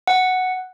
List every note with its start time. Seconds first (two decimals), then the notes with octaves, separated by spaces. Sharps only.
0.07 F#5